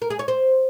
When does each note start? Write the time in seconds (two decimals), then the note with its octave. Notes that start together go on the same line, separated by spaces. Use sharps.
0.02 A#4
0.10 G#4
0.19 C#5
0.28 C5